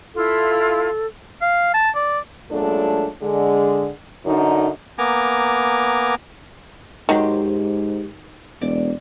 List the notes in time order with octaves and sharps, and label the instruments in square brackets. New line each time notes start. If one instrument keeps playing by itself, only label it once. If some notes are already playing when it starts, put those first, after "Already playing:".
[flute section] E4 F4 [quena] A4
[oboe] F5
A5
D5
[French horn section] F#2 A#2 F#3 G#3 A3 D4
D3 G#3
F#2 D3 D#4
[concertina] A#3 B3 G#5 A#5 D6
[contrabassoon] G#2 [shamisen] D#3 F#3 [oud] G4 B4 C5
[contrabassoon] E1 [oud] D5